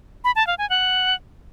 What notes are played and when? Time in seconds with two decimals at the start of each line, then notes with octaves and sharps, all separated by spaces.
0.24 B5
0.36 A5
0.47 F5
0.58 G#5
0.70 F#5